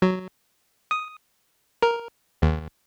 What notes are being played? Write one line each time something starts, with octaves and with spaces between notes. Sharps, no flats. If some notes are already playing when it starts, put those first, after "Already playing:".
F#3
D#6
A#4
D#2